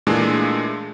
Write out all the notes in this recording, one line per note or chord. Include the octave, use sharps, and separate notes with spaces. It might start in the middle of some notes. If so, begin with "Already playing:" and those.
A#2 E3 G#3 A3 D4 G#4